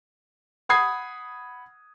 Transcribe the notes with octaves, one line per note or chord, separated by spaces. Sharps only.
F#5 B5 D#6 G#6 C7